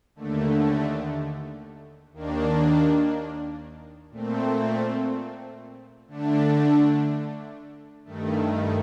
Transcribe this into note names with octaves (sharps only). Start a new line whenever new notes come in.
D#2 D3 A3
D#2 D#3 A#3 D4
A#2 A3 C4
D3 A3 D4
G2 D#3 A3